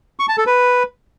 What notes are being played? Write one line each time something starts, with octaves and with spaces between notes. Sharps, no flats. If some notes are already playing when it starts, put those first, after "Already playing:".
C#6
A5
A4
B4